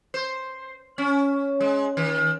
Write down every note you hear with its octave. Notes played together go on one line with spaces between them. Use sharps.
C5
C#4
G#3
D#3